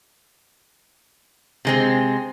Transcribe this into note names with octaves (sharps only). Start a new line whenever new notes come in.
C3 G#3 C4